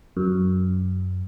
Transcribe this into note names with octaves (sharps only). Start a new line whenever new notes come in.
F#2